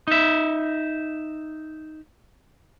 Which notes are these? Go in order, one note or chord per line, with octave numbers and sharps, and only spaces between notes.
D#4 E5